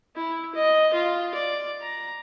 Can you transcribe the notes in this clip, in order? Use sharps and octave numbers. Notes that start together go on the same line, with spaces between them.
E4
D#5
F4
D5
A#5